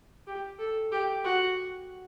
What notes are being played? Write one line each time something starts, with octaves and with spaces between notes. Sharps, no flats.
G4
A4
G4
F#4